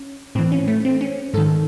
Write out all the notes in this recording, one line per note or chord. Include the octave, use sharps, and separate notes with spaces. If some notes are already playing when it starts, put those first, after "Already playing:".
Already playing: C#4
A2 E3 C4
C#4
A3
C4
C#4
G#2 D#3 A4